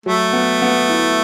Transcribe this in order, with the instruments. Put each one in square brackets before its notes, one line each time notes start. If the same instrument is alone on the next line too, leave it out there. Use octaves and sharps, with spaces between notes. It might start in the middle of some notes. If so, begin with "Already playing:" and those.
[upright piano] F#3 [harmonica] A3
[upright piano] B3
B3
E4